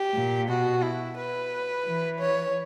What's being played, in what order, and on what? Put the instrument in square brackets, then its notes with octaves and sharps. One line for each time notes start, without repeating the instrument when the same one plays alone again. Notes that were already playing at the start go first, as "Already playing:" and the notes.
Already playing: [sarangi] G4
[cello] A#2
[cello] B2 [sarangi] F#4
[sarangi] E4
B4
[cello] E3
[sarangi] C#5